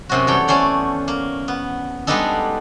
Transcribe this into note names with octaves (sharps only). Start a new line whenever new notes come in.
F#2 C3 F#4
E2 G3 A4 C#5 G5
A3 C#4 C5 D5 F#5
A#3
B3
G3 G#3 B3 D4 D#4 A4